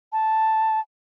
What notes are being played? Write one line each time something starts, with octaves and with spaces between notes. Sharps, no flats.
A5